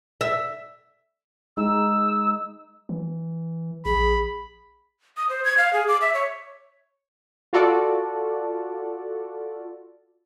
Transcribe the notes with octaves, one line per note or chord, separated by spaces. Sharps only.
E5
G#3 D#4 E6
E3
A#1 G#4 B5
D#6
C5
G#6
F5
G#4
D6
E5
C#5
F4 F#4 A4 D5